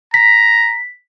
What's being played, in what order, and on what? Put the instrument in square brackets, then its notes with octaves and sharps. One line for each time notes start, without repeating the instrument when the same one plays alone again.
[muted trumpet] A#5 [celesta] B6